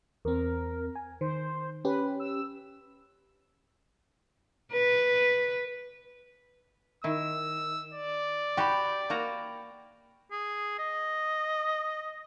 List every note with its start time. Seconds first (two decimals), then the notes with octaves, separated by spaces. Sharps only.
0.25 E2 C4 A#4
0.95 G#5
1.21 D#3 C5
1.85 C#4 G4 B4
2.20 E6
4.73 B4
7.04 D#3 E4 E6
7.93 D5
8.57 F#4 G4 G5 B5
9.10 A#3 F#4 A#5
10.31 G#4
10.79 D#5